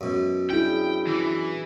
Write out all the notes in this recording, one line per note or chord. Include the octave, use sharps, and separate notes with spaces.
F#2 B2
D4 E4 G#4 G5
E3